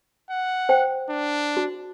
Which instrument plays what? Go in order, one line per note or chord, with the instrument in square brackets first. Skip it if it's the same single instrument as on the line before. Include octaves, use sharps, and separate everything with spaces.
[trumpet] F#5
[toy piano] C5 G5
[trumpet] D4
[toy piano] F#4